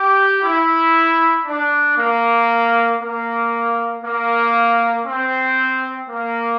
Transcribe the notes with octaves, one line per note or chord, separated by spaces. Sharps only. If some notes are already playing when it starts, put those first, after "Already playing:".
Already playing: G4
E4
D4
A#3
A#3
A#3
C4
A#3